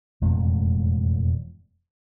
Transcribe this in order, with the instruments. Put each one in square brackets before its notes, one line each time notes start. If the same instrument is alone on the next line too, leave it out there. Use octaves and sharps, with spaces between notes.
[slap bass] E1 F2 A2 G#3